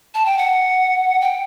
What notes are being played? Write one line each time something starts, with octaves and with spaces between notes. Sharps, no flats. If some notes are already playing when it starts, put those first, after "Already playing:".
A5
G5
F#5
G5